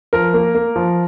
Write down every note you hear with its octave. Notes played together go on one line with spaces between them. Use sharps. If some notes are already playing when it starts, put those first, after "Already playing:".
F3 A#4
A#3
A#3
F3